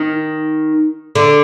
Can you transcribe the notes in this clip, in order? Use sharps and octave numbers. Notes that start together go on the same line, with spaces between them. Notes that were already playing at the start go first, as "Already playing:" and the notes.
Already playing: D#3
D3